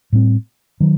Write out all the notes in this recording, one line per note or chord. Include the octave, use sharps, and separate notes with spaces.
A2 G3 C4
D#3 F#3